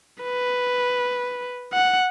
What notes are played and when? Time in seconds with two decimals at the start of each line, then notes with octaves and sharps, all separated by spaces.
0.23 B4
1.73 F#5